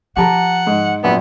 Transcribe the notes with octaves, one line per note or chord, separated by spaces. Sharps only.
F3 G4 F#5 A5 A#5
G#2
A#1 F#2 B3